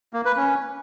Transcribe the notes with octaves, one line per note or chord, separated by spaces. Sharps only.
A#3
B4
C#4